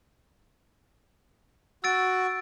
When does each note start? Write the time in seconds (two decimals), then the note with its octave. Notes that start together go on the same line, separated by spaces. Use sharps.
1.84 F#4 E6 A6 D7